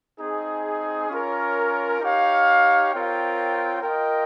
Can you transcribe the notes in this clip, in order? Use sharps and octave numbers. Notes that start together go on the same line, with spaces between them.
C4 D#4 G#4
C#4 F4 A#4 C#5
D#4 G4 C#5 F5
C4 F4 A#4 C#5 G5
F4 A#4 D#5 G5